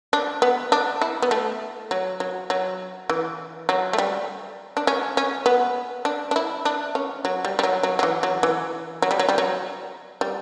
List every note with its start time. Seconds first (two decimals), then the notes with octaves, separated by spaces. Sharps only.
0.13 D4
0.42 B3
0.72 D4
1.02 E4
1.22 B3
1.31 A3
1.91 F#3
2.20 F#3
2.50 F#3
3.10 E3
3.69 F#3
3.93 A3
3.98 G3
4.77 D4
4.87 C#4
5.17 C#4
5.46 B3
6.05 D4
6.31 D4
6.36 E4
6.65 D4
6.95 C#4
7.25 F#3
7.45 G3
7.59 G3
7.63 F#3
7.83 F#3
7.99 F#3
8.03 E3
8.23 F#3
8.43 E3
9.02 F#3
9.11 G3
9.19 F#3
9.29 G3
9.38 F#3
10.21 G3